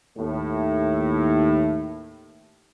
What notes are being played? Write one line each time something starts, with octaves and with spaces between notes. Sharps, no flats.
D#2 A2